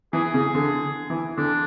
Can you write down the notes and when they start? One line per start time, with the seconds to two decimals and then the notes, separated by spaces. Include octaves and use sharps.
0.13 E3 G#4
0.34 C#3
0.55 D3
1.10 E3
1.37 D3 D4